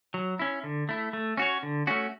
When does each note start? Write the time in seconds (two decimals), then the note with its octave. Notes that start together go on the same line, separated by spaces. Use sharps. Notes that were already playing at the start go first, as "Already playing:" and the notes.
0.14 F#3
0.39 C#4 E4
0.64 D3
0.89 A3 E4
1.13 A3
1.37 C#4 F#4 C#5
1.63 D3
1.87 A3 C#4 F#4